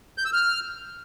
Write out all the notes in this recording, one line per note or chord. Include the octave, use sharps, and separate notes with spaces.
G6
E6
F6